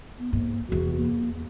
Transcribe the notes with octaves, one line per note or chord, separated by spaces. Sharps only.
B3
G#2 A#3
F1 E2 F#4
A#3
E2